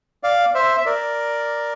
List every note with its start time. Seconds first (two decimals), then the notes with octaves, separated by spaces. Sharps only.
0.23 D5 F5
0.54 C5 E5
0.77 E5
0.86 A#4 D5